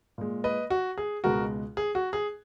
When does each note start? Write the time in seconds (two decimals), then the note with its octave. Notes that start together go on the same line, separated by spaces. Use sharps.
0.18 A#2 G#3
0.44 B4 D#5
0.70 F#4
0.98 G#4
1.24 C#2 B2 G#3 F#4 A#4
1.77 G#4
1.95 F#4
2.13 G#4